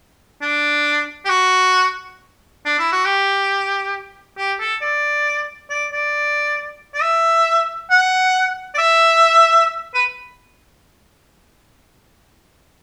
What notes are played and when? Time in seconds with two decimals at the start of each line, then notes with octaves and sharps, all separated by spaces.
0.42 D4
1.25 G4
1.30 F#4
2.66 D4
2.79 E4
2.92 F#4
3.05 G4
4.37 G4
4.60 A4
4.81 D5
5.70 D5
5.93 D5
6.94 D5
7.02 E5
7.90 F#5
8.75 D5
8.78 E5
9.94 B4